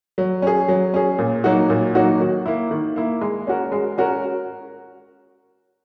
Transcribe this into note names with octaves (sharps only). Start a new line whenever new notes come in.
F#3
C#4 G#4
F#3
C#4 G#4
A#2
F#3 A#3 D#4 F#4
A#2
F#3 A#3 D#4 F#4
D#3
A#3 E4
D#3
A#3 E4
G#3
C#4 F#4 A#4
G#3
C#4 F#4 A#4